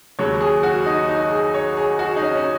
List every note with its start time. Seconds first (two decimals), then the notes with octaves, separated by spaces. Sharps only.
0.19 D#2 C#3 F#3 C#5
0.41 G#4
0.63 F#4
0.86 D#4
1.09 D#4
1.31 G#4
1.54 C#5
1.77 G#4
1.99 F#4
2.16 D#4
2.22 C#4
2.35 C#4